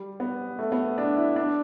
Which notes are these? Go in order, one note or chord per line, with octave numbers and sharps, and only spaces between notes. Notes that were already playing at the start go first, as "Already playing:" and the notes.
Already playing: G3
B3
A3
B3
D4
E4
D4